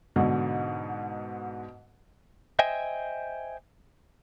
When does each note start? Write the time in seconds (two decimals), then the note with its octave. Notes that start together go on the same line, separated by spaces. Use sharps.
0.16 G#2 B2 D3
2.59 C5 D#5 E5 G5 G#5